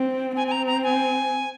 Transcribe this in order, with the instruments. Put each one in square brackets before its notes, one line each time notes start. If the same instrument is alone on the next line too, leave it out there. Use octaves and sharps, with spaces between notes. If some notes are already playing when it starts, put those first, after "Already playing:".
Already playing: [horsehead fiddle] C4
[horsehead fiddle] C4 [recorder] G#5
[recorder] G#5
A#5
A#5
G#5